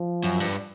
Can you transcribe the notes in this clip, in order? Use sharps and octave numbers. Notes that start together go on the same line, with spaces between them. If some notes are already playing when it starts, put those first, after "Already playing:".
Already playing: F3
F#2
G2